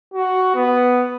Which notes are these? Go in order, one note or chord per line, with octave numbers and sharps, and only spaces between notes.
F#4
B3